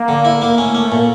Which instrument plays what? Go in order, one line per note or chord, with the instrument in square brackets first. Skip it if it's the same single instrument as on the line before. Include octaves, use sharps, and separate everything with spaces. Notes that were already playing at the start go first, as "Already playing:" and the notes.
Already playing: [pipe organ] A#3
[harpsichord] D3
E4
A#3
[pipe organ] A3 [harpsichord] C#4
[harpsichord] C#4
A#2